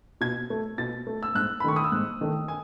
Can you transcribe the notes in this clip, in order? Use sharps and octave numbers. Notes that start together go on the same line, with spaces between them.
B2 G#6
A3
B2 A6
A3
E6
G#2 F#6
B5
D#3 A3 C#6
D#6
E6
G#2 F#6
D#3 A3
G#5